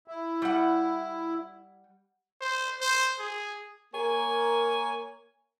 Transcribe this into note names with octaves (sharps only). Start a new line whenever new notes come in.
E4
G3 F#5
C5
C5
G#4
A#3 A#4 C#5 G#5